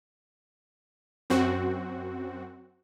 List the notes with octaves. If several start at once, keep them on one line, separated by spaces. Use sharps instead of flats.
F#2 C4 F#4